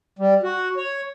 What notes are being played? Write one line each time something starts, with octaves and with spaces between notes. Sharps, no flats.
G3
F#4
C#5